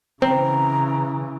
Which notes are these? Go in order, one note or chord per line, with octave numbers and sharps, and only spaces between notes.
C#3 E3 C4 A#5